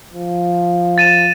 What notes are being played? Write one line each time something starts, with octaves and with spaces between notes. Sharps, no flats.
F3
A6 D#7 E7